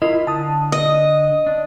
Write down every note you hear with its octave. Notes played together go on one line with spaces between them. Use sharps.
E4 F4 A#4 D#5
D3 A5 D#6
D#5 D#6
D4